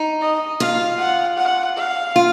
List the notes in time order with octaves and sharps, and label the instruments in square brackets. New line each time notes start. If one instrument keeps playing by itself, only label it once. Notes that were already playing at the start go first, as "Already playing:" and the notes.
Already playing: [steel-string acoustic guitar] D#4
[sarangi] D#5
[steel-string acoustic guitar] F4 [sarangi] F5
[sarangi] F#5
F#5
F5
[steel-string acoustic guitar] F4